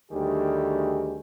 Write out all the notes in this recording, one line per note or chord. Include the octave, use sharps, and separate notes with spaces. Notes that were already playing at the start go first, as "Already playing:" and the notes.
D2 D#3 G3 G4 G#4